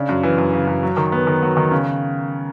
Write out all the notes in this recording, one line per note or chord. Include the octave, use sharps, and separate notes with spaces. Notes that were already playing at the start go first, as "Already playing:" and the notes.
Already playing: C#3 D4
F#2
E3
F#2
C#3
F#2
F#3
D#3
B3
D#3
F#3
D#3
C#3